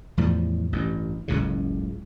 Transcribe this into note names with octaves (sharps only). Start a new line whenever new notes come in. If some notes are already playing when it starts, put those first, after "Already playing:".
E2 A2 F3 G3
A1 G2
F#1 C#2 A2 C#3